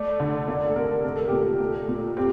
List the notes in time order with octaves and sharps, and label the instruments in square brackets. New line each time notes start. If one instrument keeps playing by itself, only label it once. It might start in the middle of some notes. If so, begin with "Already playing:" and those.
Already playing: [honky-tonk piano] A3 [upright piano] D5
[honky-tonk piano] D3
[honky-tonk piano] A#3 [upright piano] D5
[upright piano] A4
[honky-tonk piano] C3 [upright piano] A#4
[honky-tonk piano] A3 [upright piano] A#4
[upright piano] A4
[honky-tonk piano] A#2 [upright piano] G4
[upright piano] A4
[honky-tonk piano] A3
A#2
[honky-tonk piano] C4 [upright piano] G4